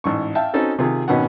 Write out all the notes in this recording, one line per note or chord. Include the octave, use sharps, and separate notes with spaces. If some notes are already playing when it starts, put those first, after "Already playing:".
A1 G#2 C#6
E5 F5 G5 A5
C4 C#4 D#4 F#4 A4
C3 D#3 F4 G#4
G#1 B2 D#3 B3 C#4 F#5